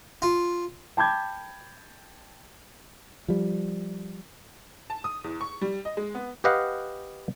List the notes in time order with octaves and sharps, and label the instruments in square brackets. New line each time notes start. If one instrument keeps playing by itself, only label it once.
[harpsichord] F4
[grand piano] G5 A5 B5 D6 G6 G#6
[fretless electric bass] F3 G3
[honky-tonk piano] A5
D#6
E2
C#6
G3
D#5
G#3
B3
[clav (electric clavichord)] G4 B4 D#5 F5 F#5